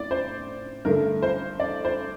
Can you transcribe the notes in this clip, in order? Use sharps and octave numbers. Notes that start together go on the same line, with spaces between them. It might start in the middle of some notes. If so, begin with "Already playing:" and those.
Already playing: A2 D5
C5
G2 D3 A3 A#4
C5
D5
C5